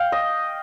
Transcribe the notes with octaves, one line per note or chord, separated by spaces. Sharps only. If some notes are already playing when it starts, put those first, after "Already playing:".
Already playing: F5 G5
D#5